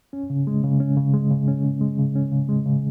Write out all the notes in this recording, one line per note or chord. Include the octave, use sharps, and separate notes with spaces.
C#4
C#3
G#3
C#3
C#4
C#3
G#3
C#3
C#4
C#3
G#3
C#3
C#4
C#3
G#3
C#3